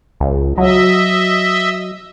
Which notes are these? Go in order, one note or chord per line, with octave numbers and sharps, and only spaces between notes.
C#2
F#3 D#5 E5